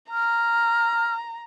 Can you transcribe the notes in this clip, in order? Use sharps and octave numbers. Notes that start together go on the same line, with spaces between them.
A#5 F6